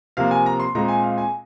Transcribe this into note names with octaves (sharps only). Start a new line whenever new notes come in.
C3 F3 A#3 F5
G#5
A#5
C6
A#2 G#3 C4 A#5
G#5
F5
G#5